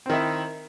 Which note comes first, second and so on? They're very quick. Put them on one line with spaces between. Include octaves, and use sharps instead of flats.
C4 D#3 E4 D#4